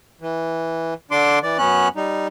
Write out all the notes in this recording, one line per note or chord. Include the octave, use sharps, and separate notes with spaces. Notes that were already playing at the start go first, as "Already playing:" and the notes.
E3
D3 D4 C6 D6
E3 D5
F#2 B3 C#4 F#6
G3 D#4